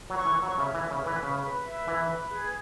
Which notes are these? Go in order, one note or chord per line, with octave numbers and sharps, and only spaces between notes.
F#3
C#6
E3
C#6
F#3
C#3 E5
E3
E5
C#3
B4
E3
C#3 B4
B4
E5
E3 B4
B4
G#4